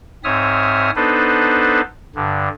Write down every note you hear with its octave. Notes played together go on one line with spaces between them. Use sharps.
G#2 C4 C#5 E5 D#6 F6
B3 D4 D#4 A4 B4 C5
G2 D3